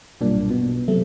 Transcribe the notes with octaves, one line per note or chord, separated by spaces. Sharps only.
B1 G2 A#2 D4
B2
F#2 C3 A3